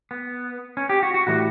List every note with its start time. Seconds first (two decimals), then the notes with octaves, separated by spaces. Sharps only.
0.11 B3
0.77 C#4
0.89 G4
1.03 F#4
1.14 F#4
1.27 A2 E3 G3 F#4